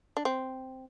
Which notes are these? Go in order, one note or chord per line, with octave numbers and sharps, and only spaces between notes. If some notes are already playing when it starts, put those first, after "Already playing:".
D4
C4